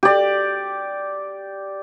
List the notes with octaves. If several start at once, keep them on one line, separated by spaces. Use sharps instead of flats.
G4 D5